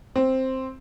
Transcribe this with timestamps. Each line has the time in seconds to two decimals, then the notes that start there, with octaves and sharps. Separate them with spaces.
0.16 C4